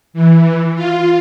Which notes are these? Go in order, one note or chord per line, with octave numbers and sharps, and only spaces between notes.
E3
F4